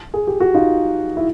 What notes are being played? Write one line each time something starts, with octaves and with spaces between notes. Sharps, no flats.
G#4
G4
F#4
D#4 F4
E4